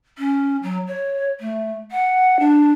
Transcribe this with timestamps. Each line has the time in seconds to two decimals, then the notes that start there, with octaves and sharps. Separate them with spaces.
0.18 C#4
0.63 F#3
0.87 C#5
1.40 A3
1.92 F#5
2.40 D4